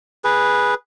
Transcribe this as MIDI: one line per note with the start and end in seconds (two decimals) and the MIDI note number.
0.24 0.74 68
0.24 0.74 71